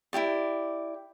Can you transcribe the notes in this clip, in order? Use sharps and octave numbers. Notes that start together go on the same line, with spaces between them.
E4 F#4 G4 D5